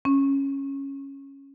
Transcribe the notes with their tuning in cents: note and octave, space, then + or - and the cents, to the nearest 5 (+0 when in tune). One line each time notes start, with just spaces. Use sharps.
C#4 -10